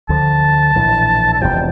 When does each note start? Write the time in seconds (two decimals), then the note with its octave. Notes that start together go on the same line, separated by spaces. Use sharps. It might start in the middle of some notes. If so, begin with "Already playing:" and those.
0.09 D2 D3 F3 A5
0.75 A#1 A2 E3
1.33 A5
1.41 E1 E2 C3 F3 G5